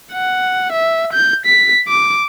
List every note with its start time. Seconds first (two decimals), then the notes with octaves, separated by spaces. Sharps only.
0.13 F#5
0.72 E5
1.13 G6
1.46 B6
1.89 D6